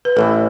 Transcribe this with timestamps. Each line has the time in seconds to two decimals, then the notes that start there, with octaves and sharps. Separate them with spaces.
0.05 B4
0.16 A1 A2 E3 A4